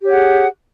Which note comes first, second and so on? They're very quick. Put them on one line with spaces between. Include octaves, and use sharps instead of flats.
G4 C#5 F#5 G#4